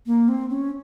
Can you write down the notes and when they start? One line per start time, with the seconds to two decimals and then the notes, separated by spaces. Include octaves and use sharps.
0.06 A#3
0.28 C4
0.49 C#4